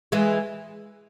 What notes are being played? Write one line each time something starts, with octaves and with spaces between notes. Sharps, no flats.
E3 G#3